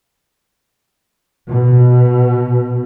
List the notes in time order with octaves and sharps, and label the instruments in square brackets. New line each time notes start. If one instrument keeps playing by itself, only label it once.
[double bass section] B2